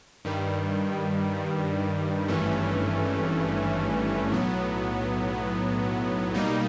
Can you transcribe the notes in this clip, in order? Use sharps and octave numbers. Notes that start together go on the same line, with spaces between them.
G2 D#3 G3
G#1 G2 E3 A3 C#4
B1 A2 F#3 B3
B2 G3 A#3 D#4